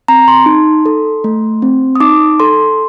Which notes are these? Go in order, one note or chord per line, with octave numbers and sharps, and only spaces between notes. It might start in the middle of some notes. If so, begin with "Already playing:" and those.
C4 A#5
C6
D#4
A4
A3
C4
D#6
D#4 D6
A4 C6